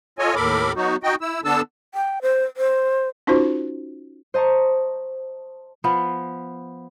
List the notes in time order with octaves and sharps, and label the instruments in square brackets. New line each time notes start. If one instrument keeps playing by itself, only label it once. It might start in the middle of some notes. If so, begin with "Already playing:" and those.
[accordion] F4 A4 C#5 D#5 G#5
D#2 A2 A4 A#4 B5 D6
F#3 B3 D#4 F#4
D#4 F#4 D#5 G5
E4 E6
D3 B3 D4 A4 A5 E6
[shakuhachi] G5
C5
C5
[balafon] C#4 D#4 F4 F#4 C5
[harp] C5 D#5 A5 A#5 C#6
[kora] F3 B3 B4 F5